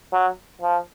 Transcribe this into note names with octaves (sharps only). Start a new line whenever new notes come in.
F#3
F3